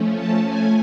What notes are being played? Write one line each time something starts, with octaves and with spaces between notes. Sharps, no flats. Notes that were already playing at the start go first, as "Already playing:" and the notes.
Already playing: F3 A3 C#4
A5
G#5